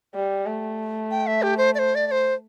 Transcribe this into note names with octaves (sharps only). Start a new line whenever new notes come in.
G3
A3
G5
E5
G4
C5
D5
C5
D5
D5
C5